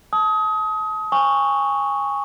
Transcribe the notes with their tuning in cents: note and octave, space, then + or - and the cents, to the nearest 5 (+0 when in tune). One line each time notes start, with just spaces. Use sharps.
A5 -20 D#6 +30
G#5 -25 C#6 +0